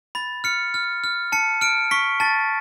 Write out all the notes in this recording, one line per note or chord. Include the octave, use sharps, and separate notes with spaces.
B5 A6
F6 C#7
F6
F6
A5 C#7
F6 D7
C#6 B6
A5 A6